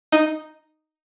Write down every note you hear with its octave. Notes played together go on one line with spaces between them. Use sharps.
D#4